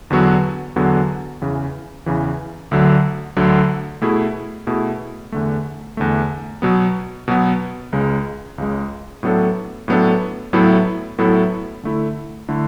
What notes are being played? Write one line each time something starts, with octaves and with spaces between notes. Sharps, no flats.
E2 D3 F#3 B3 F#4
E2 D3 F#3 B3 F#4
E2 C#3 E3
E2 C#3 E3
D2 D3 F#3
D2 D3 F#3
B2 A3 E4 G#4
B2 A3 E4 G#4
E2 D3 A3
E2 D3 A3
B2 F#3 B3
B2 F#3 B3
C#2 C#3 G#3
C#2 C#3 G#3
A2 F#3 B3 D4 A4
A2 F#3 B3 D4 A4
A2 F#3 B3 E4 A4
A2 F#3 B3 E4 A4
D3 A3 E4
D3 A3 E4